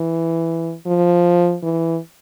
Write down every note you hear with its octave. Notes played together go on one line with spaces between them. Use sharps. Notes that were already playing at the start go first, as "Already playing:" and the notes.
Already playing: E3
F3
E3